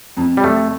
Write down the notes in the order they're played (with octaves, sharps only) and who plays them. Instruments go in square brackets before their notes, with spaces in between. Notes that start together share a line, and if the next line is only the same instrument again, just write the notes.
[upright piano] F2
[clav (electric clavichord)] G3
A3